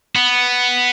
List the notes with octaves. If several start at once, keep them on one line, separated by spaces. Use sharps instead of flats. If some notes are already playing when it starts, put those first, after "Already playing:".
B3